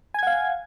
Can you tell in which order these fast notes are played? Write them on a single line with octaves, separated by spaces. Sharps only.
G#5 G#6 F#5 F5